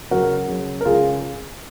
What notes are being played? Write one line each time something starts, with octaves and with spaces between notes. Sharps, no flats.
C#3 F#3 F#4 A#4
C#3 F#3
A#4
C#3 G#3 F4 G#4